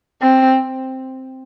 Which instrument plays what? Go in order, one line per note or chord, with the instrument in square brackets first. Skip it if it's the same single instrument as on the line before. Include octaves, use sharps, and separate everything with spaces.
[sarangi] C4